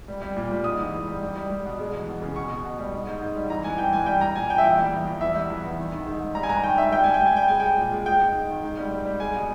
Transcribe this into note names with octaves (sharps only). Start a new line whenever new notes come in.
G3
G3
A#2
G3
G#2 D#6
E3
G#2
G3
G3
G3
G3
B2
G#3
E2
E2
C#3
B2 C#6
B2
B2
G3
G#2
G#2
G#2
G3
E3 A#5
G2 G#5
E3 G5
G2 G#5
G3 G5
G3 A#5
A#2 G#5
A#2 G5
E5
E2 G5
G3
E2
E2
E2 E5
G3
E2
E2
D#3
D#3
G#2
G#2
G3 A#5
G#5
G2 A#5
D#3 G5
G3 E5
G3 G5
G3 G#5
G5
G3 G#5
G3 G5
G#3 G#5
G#3 G5
A#2
G#3
G#3 G5
G#2
G#2
D#3
G#2
G3
G3
G3
G#3 G#5
B2